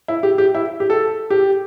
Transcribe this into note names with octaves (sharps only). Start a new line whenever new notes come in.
E4
G4
G4
E4
G4
A4
G4